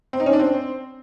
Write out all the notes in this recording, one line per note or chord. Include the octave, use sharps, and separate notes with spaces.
C4
D#4
C#4
D4
C4